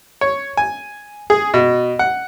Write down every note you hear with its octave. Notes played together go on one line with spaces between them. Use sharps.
C#5
G#5
G#4
B2
F#5